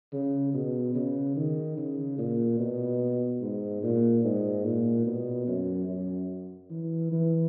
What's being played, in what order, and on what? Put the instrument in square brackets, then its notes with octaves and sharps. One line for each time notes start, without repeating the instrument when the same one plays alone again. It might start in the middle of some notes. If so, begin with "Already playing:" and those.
[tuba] C#3
B2
C#3
D#3
C#3
A#2
B2
G#2
A#2
G#2
A#2
B2
F#2
F#2
E3
E3